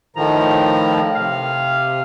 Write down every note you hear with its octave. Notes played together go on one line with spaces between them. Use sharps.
A2 D#3 F3 A#5
C3 F5